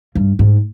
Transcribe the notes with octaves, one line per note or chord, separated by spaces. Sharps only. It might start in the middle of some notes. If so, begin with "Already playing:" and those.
G2
G#2